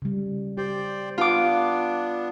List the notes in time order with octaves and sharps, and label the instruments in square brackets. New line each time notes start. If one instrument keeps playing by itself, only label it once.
[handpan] C#3 G3
[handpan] G4 [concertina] C5 D5 G5
[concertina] B3 D4 [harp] F4 D6